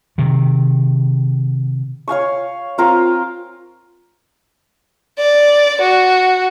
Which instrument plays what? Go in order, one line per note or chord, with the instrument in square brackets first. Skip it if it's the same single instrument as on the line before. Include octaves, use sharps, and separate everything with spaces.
[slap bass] C3 D#3
[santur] C#5 F5 G#5 C#6
C4 F4 A#4 F5
[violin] D5
F#4